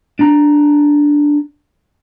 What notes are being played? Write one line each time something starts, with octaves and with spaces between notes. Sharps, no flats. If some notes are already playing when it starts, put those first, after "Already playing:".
D4 A#5